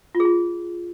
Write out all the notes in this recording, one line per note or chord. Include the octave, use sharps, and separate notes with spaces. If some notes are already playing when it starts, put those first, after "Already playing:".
F4
G#4
F4